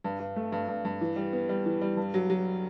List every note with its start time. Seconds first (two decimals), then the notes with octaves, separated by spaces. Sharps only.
0.04 G2
0.20 G2
0.36 A3
0.52 G2
0.68 G2
0.85 G2
1.01 E3
1.16 G3
1.33 B3
1.49 G3
1.66 E3
1.81 G3
1.97 G2
2.14 F#3
2.30 F#3